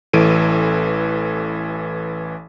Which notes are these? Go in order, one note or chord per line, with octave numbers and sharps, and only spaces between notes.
A1 E3 A4 D7 D#7